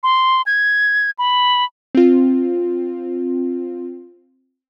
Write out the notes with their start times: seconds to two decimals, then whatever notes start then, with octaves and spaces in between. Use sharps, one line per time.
0.03 C6
0.46 G#6
1.19 B5
1.95 C4 F4